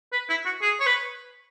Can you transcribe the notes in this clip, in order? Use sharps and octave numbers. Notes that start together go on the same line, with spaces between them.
B4
E4
F#4
G#4
C#5
B4